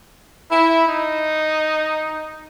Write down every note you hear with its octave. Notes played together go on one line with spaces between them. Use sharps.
E4
D#4